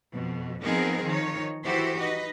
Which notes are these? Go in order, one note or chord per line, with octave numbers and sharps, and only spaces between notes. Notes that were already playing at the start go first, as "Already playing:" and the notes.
F2 B2
F3 B3 C4 D#4 G#4 A#4
D#3 F3 D#4 C#5
E3 E4 F#4 G4 A4 C5
D#4 B4 D#5